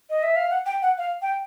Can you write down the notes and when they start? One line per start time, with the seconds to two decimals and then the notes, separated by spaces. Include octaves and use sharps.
0.10 D#5
0.23 E5
0.36 F5
0.50 F#5
0.66 G5
0.82 F#5
0.98 F5
1.22 G5